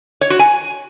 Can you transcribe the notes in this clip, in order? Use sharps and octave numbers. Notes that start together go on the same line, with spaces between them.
C#5
F#4
G#5